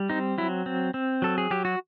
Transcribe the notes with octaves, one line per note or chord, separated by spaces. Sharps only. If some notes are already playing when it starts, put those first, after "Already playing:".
Already playing: G3
C4 D#4
F#3 E4
C4
C4
F#3 A4
G#4
F#3 G4
F#4